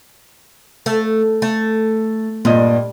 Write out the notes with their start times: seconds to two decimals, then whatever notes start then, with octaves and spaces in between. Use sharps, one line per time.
0.86 A3
1.42 A3
2.45 G2 A#2 D#5